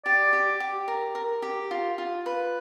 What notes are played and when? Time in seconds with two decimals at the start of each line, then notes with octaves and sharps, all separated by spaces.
0.05 G4 D5
0.33 G4
0.60 G4
0.88 A#4
1.15 A#4
1.42 G4
1.71 F4
1.98 F4
2.26 B4